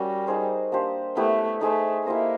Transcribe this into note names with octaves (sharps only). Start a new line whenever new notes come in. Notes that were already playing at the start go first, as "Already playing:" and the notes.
Already playing: G3 C#4 F#4 A#4
D#4 G#4 C5
A#3 D4 G4 C5
A3 B3 E4 G4 B4
A3 D#4 G#4 C5 E5
A#3 E4 G4 C5 D#5